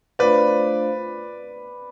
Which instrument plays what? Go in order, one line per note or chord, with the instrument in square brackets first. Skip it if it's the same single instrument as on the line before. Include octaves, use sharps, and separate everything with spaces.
[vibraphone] A3 D4 F4 C5 F5 [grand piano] B4 D5